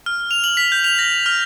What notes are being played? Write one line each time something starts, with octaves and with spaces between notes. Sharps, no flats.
F6
F7
F#7
B6
G6
F7
A#6
F6